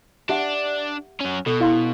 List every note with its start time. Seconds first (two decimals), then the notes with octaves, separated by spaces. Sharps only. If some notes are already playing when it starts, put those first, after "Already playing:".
0.29 D4 G4 E5 F#5
1.20 F#3 C#4
1.46 B2 A4
1.60 E4 F5 C6